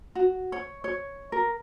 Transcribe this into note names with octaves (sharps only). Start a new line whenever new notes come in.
F#4
C#5
C#5
A#4